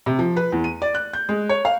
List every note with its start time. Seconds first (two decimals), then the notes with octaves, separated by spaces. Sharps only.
0.06 C3
0.19 F3
0.36 B4
0.52 E2
0.64 D#7
0.82 D5
0.95 F#6
1.13 G6
1.29 G#3
1.49 C#5
1.65 F5